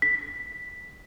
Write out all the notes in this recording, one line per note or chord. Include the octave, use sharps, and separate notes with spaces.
B6